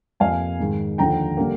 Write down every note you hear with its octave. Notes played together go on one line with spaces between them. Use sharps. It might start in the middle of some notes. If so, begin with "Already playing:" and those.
F2 C3 F3 A#3 F5 G#5
G#2 D#3 G#3
D#2 D3 F3 G5 A#5
D3 G3 A#3